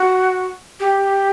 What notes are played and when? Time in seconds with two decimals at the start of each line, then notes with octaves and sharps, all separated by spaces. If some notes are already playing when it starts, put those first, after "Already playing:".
Already playing: F#4
0.80 G4